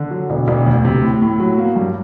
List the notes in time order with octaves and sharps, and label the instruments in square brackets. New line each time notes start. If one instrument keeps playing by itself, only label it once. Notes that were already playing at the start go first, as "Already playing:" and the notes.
Already playing: [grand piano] D3
F#3
E1
E1
D2
C3
A2
A2
F#3
A#3
G2